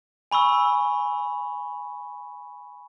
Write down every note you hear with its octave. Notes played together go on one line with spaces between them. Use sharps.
G#5 B5 C#6 E6